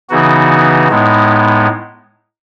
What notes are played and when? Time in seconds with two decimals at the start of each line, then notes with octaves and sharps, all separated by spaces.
0.09 C#3 E3 B3 D#4 F#4
0.89 A2 G#3 B3 D#4